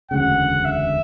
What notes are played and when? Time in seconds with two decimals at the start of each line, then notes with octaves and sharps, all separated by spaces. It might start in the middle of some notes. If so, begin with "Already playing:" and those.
0.11 E1 D2 C#3 F#5
0.65 E5